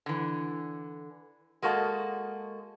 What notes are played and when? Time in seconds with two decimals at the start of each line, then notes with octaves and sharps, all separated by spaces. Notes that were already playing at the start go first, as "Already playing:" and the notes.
0.06 D3 E3
1.62 G#3 A#3 F#4 A4 D#5